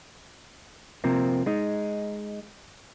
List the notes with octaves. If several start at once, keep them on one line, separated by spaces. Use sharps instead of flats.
C3 F3 A#3 C4
G#3 D#4